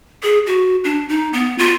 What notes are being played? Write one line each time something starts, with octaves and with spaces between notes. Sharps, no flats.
G#4
F#4
D4
D#4
B3
F4